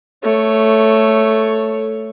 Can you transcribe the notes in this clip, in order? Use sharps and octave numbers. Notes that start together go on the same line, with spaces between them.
A3 C#5